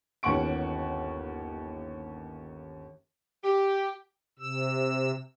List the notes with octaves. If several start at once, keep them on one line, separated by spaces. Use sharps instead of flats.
G1 D#2 C#4 F#5 C#6 D7
G4
C3 E6